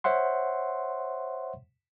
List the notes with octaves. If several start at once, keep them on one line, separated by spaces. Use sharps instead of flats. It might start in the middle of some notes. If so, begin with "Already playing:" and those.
C5 C#5 E5 F#5 C6